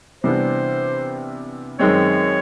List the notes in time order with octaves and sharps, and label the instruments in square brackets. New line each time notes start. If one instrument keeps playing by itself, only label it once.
[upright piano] C3 E3 G3 B3 D4 [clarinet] C5
[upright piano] F#2 D#3 G#3 C4 [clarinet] C#5